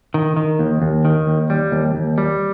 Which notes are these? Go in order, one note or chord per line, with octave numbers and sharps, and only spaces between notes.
D#3
D#3
D#2
D#2
D#3
D#2
G3
D#2
D#2
G3